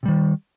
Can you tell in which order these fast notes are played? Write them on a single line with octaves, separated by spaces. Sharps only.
C3 G3 D#3